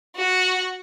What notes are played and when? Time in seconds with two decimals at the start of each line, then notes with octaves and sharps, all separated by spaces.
0.16 F#4